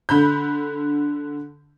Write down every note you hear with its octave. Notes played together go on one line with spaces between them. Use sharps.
D3 B5 G6